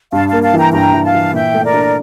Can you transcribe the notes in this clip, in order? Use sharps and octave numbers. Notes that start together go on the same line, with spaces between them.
G2 F5 A5
A#3 F5 A5
F5 A5
E3 G5 A#5
G2 G5 A#5
E3
F5 A5
E3
A#2 E5 G5
A3
A#4 D5
D4